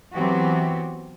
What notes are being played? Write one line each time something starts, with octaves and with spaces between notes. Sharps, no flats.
E3 F#3 B3 C4 F#4 G4